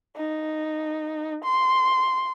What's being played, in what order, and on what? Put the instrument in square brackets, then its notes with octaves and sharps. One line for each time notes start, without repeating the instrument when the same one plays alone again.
[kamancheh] D#4
C6